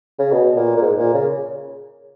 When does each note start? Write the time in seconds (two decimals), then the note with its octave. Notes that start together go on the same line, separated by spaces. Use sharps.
0.19 C#3
0.32 B2
0.56 A#2
0.77 A#2
0.81 G#2
0.98 A#2
1.14 C#3